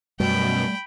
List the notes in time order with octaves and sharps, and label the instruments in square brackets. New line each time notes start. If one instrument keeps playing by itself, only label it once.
[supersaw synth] F#2 B2 [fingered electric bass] G3 A3 [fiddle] G5 B5